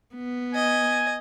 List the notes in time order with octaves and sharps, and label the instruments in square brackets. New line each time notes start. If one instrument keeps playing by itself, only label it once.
[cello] B3
[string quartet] D#5 [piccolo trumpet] G#5